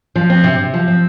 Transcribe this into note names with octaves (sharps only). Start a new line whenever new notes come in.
F3
C4
C3
C3
F3
C4